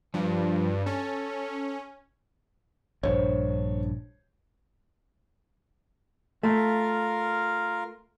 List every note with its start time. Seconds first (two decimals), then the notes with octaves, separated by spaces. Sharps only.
0.14 G2 F3
0.86 C#4 A4
3.03 A#1 G2 C5 C#5
6.43 A3 F4 A#4 F5